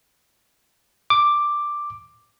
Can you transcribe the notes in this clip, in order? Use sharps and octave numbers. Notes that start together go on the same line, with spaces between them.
D6